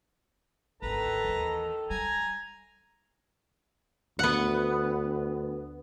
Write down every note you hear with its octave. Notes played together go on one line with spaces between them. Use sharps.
G#1 D2 D#3 A4 B4 A#5
D#2 E3
G3 G#5 A#5
D2 B3 F#5